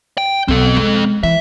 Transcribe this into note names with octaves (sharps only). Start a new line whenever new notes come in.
G5
B1 C4 A4
G#3
E3 E5